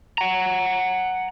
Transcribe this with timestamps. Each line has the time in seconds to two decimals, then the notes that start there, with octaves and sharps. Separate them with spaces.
0.18 F#5 A#5